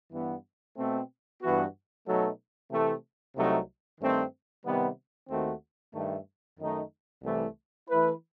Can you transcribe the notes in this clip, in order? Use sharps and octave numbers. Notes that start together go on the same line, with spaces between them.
G2 E3 B3
B2 A3 C4
G2 E3 B3 F#4
B2 F#3 A3 D#4 A4
C3 E3 A3
C2 C3 F#3 A3 D#4
G2 D#3 A3 C4
C3 D#3 G3 B3
D#2 D#3 A3 C4 F#4
G2 D#3 A3
F#2 D#3 A3 D#4
C2 C3 E3 A3
E3 A3 E4 B4